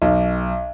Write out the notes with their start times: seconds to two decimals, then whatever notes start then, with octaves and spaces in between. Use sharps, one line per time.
0.02 B1